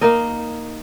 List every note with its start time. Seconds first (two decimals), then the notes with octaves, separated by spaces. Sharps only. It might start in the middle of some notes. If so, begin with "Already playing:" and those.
0.01 A#3 D#4 A#4 D#5